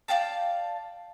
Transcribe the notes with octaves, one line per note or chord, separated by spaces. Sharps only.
D5 F5 G5 A5